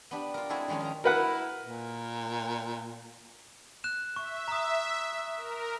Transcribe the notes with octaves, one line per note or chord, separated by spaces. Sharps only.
B3 D4 G4
F4 A#4
G#3 C4 E4 F#4 G#4 A4
D#3 F3 G#3 C#4 D#4
A#4 A#5
E4 A#4 B4 F#5
A#2
F#6 E7
E5 C#6
A#5 D#6
A#4